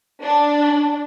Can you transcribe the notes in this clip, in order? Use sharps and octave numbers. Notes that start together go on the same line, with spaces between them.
D4